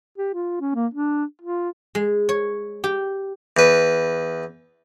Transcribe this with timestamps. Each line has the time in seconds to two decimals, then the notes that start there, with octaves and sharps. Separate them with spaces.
0.18 G4
0.34 F4
0.61 C#4
0.75 A#3
0.94 D4
1.42 F4
1.95 G#3
2.29 C#5
2.84 G4
3.57 E2 B4